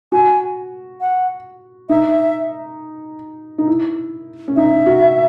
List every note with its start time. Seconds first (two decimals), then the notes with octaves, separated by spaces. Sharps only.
0.12 F#4 G#5
1.01 F#5
1.89 D#4 E5
3.58 D#4
3.67 E4
4.48 C#4
4.56 D#4 E5
4.86 F#4